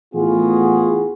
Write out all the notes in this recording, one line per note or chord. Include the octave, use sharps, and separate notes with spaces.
A2 E3 B3 F4 F#4 G#4